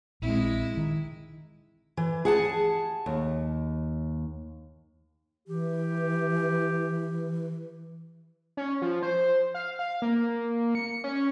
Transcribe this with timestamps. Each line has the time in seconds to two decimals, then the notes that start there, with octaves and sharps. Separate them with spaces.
0.22 A#1 G#3 C4 E4
0.77 D#3
1.97 E3
2.25 G#4 F#5 A5
3.06 D#2
5.48 E3 G4
8.57 C#4
8.82 F3
9.02 C5
9.54 F5
9.79 F5
10.02 A#3
10.75 C#7
11.04 C#4